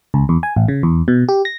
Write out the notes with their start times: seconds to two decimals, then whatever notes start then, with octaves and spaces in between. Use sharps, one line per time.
0.14 C#2
0.29 E2
0.43 G#5
0.56 A1
0.68 C#3
0.83 E2
1.08 B2
1.29 G4
1.45 A#6